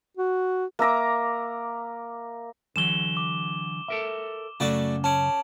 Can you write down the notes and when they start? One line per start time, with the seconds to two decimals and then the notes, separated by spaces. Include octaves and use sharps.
0.17 F#4
0.79 A#3 E5 A#5 D6
2.76 D3 E3 F#3 E7 G7
3.17 D6
3.88 A4 A#4 E5
4.60 F#2 C#3 A3 F#4 D5
5.04 C#4 A5 D7 F#7